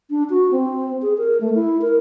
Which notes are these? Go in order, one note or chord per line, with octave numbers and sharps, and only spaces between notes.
D4
F#4
C4
G#4
A#4
A3
E4
A#4